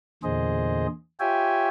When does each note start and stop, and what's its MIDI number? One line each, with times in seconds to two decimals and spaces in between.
0.23 0.87 40
0.23 0.87 46
0.23 0.87 50
0.23 0.87 68
0.23 0.87 72
0.23 0.87 75
1.20 1.69 65
1.20 1.69 67
1.20 1.69 73
1.20 1.69 76
1.20 1.69 79
1.20 1.69 80